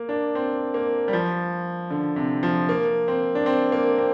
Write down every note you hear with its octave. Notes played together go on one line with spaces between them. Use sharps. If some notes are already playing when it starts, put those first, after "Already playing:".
Already playing: A#3
D4
C4
A#3
G3
F3
D3
C3
F3
A#3
C4
D4
C4
A#3
C4